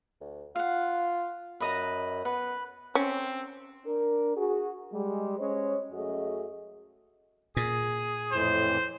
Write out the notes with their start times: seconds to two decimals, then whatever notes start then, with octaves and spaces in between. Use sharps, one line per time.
0.21 D2
0.56 F4 F5 F#5
1.60 F#2 B4 D#5 A#5
2.25 B3 B4
2.95 C4 C#4
3.85 D4 A#4
4.37 F#4 G#4
4.92 G3 G#3
5.38 G#3 C#4 C5 C#5
5.92 F#2 A3 F#4 G#4 D#5
7.57 A#2 G#4
8.33 F2 A2 E3 C5